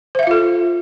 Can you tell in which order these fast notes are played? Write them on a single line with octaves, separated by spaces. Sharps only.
C5 E5 F5 F4 A4